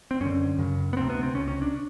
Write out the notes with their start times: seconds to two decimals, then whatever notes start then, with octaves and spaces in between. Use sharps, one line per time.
0.11 C4
0.21 F#2 D3 C#4
0.58 F#2 C#3
0.93 B3
0.97 D2 C3 C4
1.10 B3
1.23 C4
1.35 C#2 C3 C#4
1.48 C#4
1.62 D4